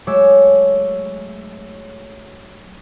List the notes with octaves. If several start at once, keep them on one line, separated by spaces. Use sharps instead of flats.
F#3 G#3 A3 C#5 D6 E6